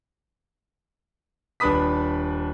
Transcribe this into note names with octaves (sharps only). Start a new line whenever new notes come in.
D#1 D4 B4 B5 D#6 B6